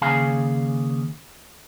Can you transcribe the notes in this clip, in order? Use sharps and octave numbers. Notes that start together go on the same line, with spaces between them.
D#2 C#3 G#4 F5 G#5